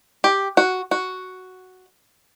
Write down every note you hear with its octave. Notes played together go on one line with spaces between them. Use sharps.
G4
F#4
F#4